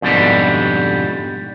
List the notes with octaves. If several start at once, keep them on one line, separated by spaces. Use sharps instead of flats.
F2 G#2 B2 D3 G3